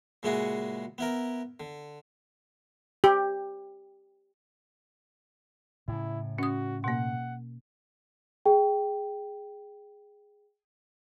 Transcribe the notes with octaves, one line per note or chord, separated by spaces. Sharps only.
A#2 C#3 G#3 E4 F#4 G#4
B3 E4 A#4
D3
G4
A2 C#3 E4
C#4 F#4 D#6
B2 A#3 F#5
G#4 G5